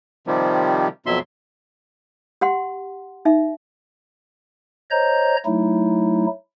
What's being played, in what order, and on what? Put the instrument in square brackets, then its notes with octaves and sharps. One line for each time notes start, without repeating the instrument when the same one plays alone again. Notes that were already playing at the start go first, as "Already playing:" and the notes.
[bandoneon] C3 D#3 F3 G3
F2 B2 F#3 E5 C6
[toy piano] G4 F#5 C6
D#4 E5
[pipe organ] C5 C#5 D#5 A#5 G6
F#3 A3 D#4 E4